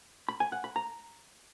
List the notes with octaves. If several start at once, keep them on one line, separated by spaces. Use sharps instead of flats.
B5
G#5
F#5
B5
A#5